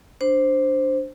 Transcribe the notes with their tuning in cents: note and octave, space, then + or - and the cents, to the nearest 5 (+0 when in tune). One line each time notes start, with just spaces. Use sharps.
D4 +0 C5 +0